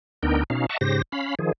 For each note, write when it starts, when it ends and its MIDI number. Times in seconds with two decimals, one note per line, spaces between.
0.23 0.43 38
0.23 0.43 59
0.23 0.43 62
0.23 0.43 63
0.23 0.43 70
0.23 0.43 79
0.50 0.66 47
0.50 0.66 61
0.50 0.66 63
0.50 0.66 77
0.69 0.77 75
0.69 0.77 76
0.69 0.77 78
0.69 0.77 81
0.69 0.77 85
0.81 1.02 44
0.81 1.02 49
0.81 1.02 67
0.81 1.02 72
0.81 1.02 94
1.12 1.35 61
1.12 1.35 77
1.12 1.35 83
1.39 1.52 51
1.39 1.52 53
1.39 1.52 68